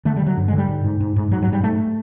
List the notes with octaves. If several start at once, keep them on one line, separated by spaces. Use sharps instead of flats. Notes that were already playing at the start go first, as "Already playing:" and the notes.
D3 A3
G3
D3 F#3
G2
G#3
D3
G3
G#2
G#2
G#2
G#2
G#2 F#3
G#2 F#3
G3
G#2 A3